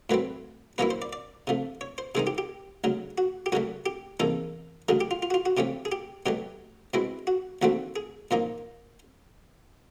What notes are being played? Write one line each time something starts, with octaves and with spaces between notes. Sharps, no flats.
A2 F#3 A3 C4 B4
A#2 F#3 A#3 C#4 E4 B4
C5
D5
D5
C3 F3 A3
C#5
C5
C3 D#3 G#3 C4 D#4 G#4
G4
G4
D2 C#3 F#3
F#4
G4
F#2 C#3 F#3 A3 F#4
G4
E2 C3 F3 A#3 D#4 A4
D2 C#3 F#3 A3 G#4
G4
F4
F4
F#4
F4
F#4
C3 F3 A3 C#4 G4
G#4
G4
B2 F#3 A3 G4
B2 G#3 C4 E4
F#4
D#2 D3 F3 A3 C4 F#4
G#4
A#2 F3 A#3 D#4